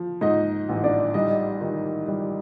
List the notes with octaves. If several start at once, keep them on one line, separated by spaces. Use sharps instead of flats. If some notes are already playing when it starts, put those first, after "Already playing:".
Already playing: F3
G#2 D#4 D#5
A1
D4 D5
G3 D#4 D#5
D#3
G3